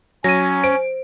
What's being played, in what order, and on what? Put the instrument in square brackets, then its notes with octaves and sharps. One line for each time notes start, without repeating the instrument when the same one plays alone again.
[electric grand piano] F#3 [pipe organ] C#4 [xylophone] A#6 D#7
[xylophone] C5 [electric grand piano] D7